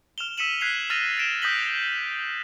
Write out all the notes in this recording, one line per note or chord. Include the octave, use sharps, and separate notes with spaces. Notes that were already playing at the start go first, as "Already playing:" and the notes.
F6 E7 F7 G7
E6 B6 C#7 D#7 E7 F#7
F#6 G#6 B6 C7 F7
E6 F6 A6 A#6 D#7 F7
A6 A#6 D7 E7
D#6 G6 A#6 B6 F#7 G7